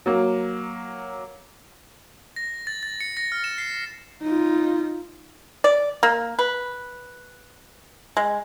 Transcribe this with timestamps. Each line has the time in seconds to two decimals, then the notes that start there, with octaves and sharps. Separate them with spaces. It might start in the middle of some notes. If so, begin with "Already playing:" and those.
0.06 F#3 A#3
2.36 A#6
2.67 A6
2.83 A6
3.01 C#7
3.17 A#6
3.32 F6
3.44 E7
3.58 C7
4.23 D#4 F4
5.64 D5
6.03 A#3
6.39 B4
8.17 G#3